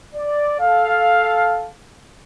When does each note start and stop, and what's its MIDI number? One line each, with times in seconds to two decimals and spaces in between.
0.14 0.56 74
0.59 1.67 69
0.59 1.67 77